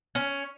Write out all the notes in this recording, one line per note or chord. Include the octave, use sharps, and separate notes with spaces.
C#4